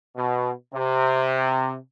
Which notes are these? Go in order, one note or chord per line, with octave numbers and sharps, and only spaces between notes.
B2
C3